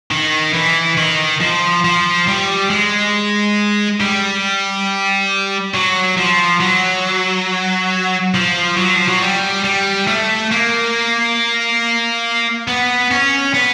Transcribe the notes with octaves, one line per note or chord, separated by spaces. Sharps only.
D#3
E3
D#3
F3
F3
G3
G#3
G3
F#3
F3
F#3
F3
F#3
F3
F#3
G3
G3
A3
A#3
B3
C#4
B3